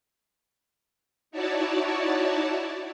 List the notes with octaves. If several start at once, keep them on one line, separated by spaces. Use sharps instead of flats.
D#4 E4 F#4 C#5 D5 A5